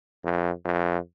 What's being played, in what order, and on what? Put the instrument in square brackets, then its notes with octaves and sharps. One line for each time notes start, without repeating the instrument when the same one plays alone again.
[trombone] F2
F2